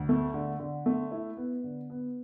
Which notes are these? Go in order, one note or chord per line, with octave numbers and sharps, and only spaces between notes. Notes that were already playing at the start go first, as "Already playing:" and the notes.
Already playing: D2
A3
D3
D3
A3
E4
B3
D3
B3